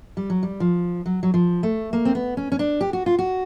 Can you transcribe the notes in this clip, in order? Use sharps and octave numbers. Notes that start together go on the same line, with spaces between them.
G3
F#3
G3
F3
F#3
F#3
F3
A3
A#3
C4
B3
C#4
C#4
D4
G4
F#4
F4
F#4